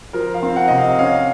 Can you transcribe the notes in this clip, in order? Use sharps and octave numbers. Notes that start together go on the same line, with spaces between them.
F3 A#4
F5
C4
F#5
C3 D#5
F5
C#4 F5